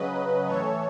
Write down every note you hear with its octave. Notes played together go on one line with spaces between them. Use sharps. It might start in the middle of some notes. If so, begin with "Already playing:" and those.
Already playing: C#3 F#3 B4 D#5
A2 E3 A4 C#5